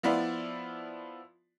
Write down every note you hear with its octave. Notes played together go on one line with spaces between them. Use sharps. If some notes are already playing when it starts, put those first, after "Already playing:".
F3 B3 E4 F4 D5